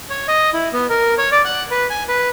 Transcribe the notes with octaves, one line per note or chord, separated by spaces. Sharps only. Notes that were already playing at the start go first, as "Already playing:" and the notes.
C#5
D#5
E4
B3
A#4
C#5
D5
F#5
B4
G#5
B4